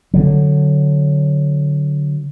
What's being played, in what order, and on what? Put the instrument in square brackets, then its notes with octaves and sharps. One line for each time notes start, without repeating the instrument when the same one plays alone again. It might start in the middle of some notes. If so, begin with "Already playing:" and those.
[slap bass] D3 F#3